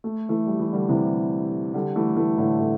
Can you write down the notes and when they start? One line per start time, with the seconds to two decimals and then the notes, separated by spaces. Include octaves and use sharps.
0.04 A3
0.29 E3 A3
0.47 G3
0.60 E3
0.73 D3 G3
0.89 C3 E3
1.74 D3 G3
1.96 E3 A3
2.16 E3 A3
2.38 A2 D3
2.59 A2